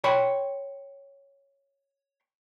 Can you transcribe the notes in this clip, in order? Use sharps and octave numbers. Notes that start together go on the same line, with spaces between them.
C#5 G5 B5 C6